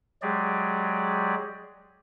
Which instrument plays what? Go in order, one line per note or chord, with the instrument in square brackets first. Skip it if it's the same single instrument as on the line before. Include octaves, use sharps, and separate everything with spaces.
[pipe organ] F#3 G#3 G4 G#4 D5